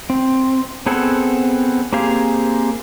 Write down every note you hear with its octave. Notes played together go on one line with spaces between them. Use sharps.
C4
B3 C4 G#4 A4 F#5
A#3 C4 G4 G#4 F5